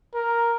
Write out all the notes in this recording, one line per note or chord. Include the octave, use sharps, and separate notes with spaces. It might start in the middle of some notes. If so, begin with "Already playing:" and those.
A#4